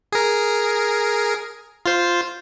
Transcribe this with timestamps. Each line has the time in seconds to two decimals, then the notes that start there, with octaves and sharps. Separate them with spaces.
0.12 G#4 A#4
1.86 F4 C5